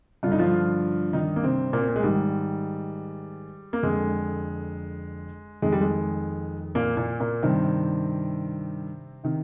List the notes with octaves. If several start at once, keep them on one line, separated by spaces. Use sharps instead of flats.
G2 D3 F4
D#4
F3 F4
D#3 D#4
A#3
C3 C4
A#2 A#3
C4
A#3
G#3
G#2 D#3 G3
A#3
F2 D3 G#3
F2 D#3 G#3
G3
G#3
A#2 A#3
A#2 A#3
A#2 A#3
G2 C3 D#3 C4
C3 D#3